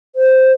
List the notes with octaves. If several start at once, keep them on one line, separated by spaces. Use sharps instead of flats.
C5